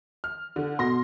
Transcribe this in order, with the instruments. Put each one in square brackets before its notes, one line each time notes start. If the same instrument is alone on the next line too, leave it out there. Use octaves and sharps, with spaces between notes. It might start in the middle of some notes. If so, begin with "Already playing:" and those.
[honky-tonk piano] F6
D3
[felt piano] B2 [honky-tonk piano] C6 A#6